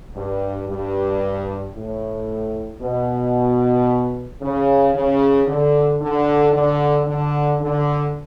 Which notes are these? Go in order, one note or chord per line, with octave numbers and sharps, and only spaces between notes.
G2
G2
A2
B2
C#3
C#3
D3
D3
D3
D3
D3